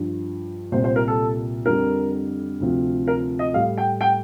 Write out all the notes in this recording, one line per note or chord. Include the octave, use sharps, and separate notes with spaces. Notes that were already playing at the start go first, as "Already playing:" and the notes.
Already playing: G2 F3
C2 A#2 G3 C5
C5
A#4
A4
F2 D3 G3 A#4
D2 C3 F3
A#4
D#5
A2 G3 F5
G5
G5